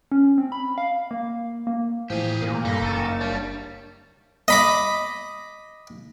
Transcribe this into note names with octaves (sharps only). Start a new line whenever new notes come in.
C#4
C4
B5
F5
A#3
A#3
A2 E3 F3 G4 G#4
A#2 A#3
G2 D#4 A4 B5
F#1 C#6 E6 A6
G3 D4 C#5 A5
D#5 B5 D6